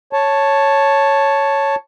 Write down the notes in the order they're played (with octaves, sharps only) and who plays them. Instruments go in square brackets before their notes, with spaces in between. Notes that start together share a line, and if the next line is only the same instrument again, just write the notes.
[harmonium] C#5 A5